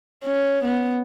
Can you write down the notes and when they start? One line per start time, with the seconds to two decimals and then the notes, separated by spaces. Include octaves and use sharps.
0.25 C#4
0.64 B3